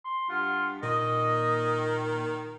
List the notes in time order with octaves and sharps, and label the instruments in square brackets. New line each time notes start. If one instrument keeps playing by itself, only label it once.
[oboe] C6
[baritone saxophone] G2 [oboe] F4 [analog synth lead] F#5
[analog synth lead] A#2 [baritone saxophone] D#3 [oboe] D#5